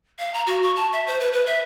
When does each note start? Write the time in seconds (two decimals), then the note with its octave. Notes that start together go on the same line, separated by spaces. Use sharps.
0.19 F5
0.34 A#5
0.47 F#4
0.63 C#6
0.76 A5
0.93 E5
1.07 C5
1.20 B4
1.33 B4
1.46 E5